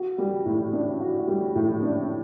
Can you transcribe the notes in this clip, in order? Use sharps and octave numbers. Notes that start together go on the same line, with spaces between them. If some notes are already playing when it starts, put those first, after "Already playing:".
Already playing: F#4
G3
A2
D4
F#4
G3
A2
D4